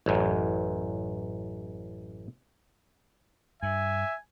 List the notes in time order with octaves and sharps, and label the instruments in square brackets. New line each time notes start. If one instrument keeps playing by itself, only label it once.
[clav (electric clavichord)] A1 F#2
[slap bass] G2 [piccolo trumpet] E5 [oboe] G#5